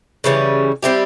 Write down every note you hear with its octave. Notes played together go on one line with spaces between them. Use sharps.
C#3 E3 G3 C#4
G3 C4 E4 G4